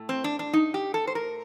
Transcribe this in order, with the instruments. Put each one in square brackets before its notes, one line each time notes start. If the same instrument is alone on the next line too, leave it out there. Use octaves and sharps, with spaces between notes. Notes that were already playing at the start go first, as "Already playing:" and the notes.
Already playing: [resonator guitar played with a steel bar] A2 A3
C4
D4
D4
D#4
G4
A4
C5
A#4